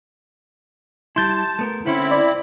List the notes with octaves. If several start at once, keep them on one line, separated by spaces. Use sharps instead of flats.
G3 E4 A5 C6 G6 A6
A3 B3 A#4
D3 C4 C#4 E4 B5 C6
D5